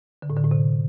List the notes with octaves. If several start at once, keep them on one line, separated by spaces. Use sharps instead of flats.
D3
A2
D3
A2
C3